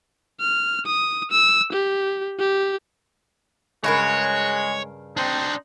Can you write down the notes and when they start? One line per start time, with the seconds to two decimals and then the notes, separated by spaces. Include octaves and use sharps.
0.40 F6
0.86 D#6
1.31 E6
1.73 G4
2.39 G4
3.84 G2 C#3 G#3 F#4 A#4 C#5
5.17 C4 D4 D#4 C5